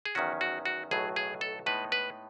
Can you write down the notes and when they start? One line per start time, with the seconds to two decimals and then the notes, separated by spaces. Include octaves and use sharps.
0.05 G#4
0.15 E2 D#3 F#3 C#4 F#4
0.41 F#4
0.66 F#4
0.91 B1 A2 F#3 G#4
1.16 G#4
1.41 A4
1.66 A2 G#3 B3 D#4 B4
1.92 B4